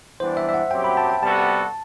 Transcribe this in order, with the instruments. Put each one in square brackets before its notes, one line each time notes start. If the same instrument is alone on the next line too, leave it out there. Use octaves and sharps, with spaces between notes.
[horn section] E3 G3 B3 D4 [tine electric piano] C5
[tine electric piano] E5
E5
F#5
[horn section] F#2 F#3 C4 G4 [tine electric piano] G5
[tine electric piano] B5
A5
G5
[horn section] C3 G3 B3 F#4 A4 [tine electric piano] A5